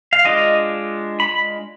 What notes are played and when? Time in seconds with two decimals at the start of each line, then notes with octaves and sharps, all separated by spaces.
0.13 F5
0.25 G#3 D4 F4 D#5
1.20 B5